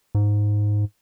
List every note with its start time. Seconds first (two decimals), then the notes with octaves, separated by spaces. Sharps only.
0.15 G#2